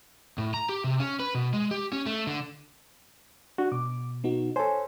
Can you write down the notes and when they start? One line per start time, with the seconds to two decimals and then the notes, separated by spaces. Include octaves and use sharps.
0.38 A2
0.54 A#5
0.69 G4
0.84 C3
1.00 C#4
1.20 B4
1.35 B2
1.53 G#3
1.71 G4
1.93 C#4
2.06 A3
2.27 D3
3.58 D4 F#4
3.72 B2 D6
4.24 B3 D#4 F#4
4.56 A4 C5 C#5 G#5